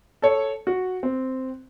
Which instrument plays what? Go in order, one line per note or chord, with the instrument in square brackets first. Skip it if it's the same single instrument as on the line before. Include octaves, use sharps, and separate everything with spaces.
[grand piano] A4 C#5
F#4
C4